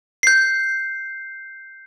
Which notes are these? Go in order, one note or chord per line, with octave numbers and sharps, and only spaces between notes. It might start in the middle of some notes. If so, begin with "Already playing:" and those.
G6 C7